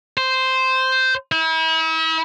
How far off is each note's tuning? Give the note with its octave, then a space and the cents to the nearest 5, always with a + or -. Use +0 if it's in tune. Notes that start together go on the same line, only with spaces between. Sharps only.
C5 -5
E4 -40